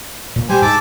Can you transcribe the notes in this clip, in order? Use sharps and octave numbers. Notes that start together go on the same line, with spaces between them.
A#2
G3 G4 C5 G#5
G#2 A5 D6 E6